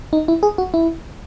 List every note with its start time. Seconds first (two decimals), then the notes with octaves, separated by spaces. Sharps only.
0.13 D#4
0.28 E4
0.43 G#4
0.58 F#4
0.74 E4